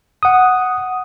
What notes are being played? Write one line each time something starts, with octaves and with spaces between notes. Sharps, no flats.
F#5 D#6